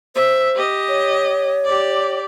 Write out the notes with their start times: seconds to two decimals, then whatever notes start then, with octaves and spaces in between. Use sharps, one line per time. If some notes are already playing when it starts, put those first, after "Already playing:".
0.15 C5 E5
0.56 G4 D#5
0.89 C#5
1.65 G4 D5